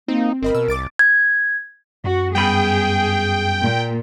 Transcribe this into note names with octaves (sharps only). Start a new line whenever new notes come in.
A#3 C4 D#4
G1 C4 A#4 D#5 B5
B2 E6
C2 D6 A6 D7
G#6
F#2 F#4
G2 B3 G#4 G5 B5
A#2